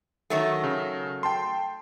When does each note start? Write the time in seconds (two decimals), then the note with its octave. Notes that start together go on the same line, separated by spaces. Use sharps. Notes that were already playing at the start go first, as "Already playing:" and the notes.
0.30 D#3 F#3 A3
0.63 C#3
1.23 G5 A5 C6